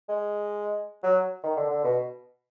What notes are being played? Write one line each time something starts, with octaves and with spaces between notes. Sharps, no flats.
G#3
F#3
D#3
D3
D3
B2